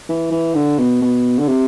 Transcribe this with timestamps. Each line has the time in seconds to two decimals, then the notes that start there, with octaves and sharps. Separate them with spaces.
0.09 E3
0.31 E3
0.55 D3
0.79 B2
1.02 B2
1.38 D3
1.48 C3